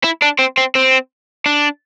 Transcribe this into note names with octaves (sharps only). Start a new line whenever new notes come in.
E4
D4
C4
C4
C4
D4